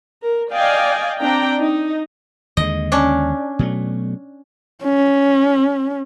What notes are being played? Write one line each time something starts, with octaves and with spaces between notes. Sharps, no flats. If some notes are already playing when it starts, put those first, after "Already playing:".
A#4
D5 D#5 F5 G5 G#5
C4 D4 D5 G5 A#5
D#4
D#2 D3 G#3 D#5
C#4 D4
B2 F#3 A3
C#4